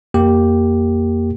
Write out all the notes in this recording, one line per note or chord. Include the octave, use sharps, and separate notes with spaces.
F2 A#3 G4